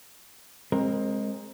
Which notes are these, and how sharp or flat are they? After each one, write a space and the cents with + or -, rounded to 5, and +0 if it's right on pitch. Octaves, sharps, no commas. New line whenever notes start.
G#3 +0 C4 +25 A#4 +0